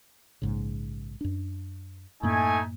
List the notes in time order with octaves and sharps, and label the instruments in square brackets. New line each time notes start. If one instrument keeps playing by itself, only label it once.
[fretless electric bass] A#1 G#2 C#3
F#2 D4
[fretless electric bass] F#2 A2 A#3 [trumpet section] A3 D#4 G#5